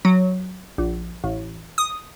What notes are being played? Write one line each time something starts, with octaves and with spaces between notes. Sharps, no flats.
F#3
A#1
A1
D#6